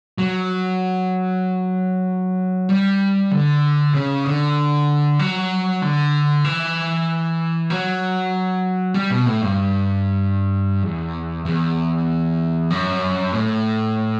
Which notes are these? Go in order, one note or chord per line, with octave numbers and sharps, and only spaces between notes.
F#3
G3
D3
C#3
D3
F#3
D3
E3
F#3
G3
B2
A2
G2
E2
E2
F#2
A2